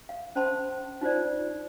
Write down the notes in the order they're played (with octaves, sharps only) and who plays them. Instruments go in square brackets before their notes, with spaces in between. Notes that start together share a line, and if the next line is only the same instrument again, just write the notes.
[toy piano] F5
C#4 C5 A5 B5 C6
D#4 F4 C5 D5